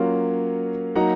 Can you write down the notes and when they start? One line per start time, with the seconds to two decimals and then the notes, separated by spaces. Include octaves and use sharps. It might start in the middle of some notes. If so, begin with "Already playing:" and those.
Already playing: F#3 A#3 C#4 F4
0.95 F#3 A#3 D#4 F#5 A#5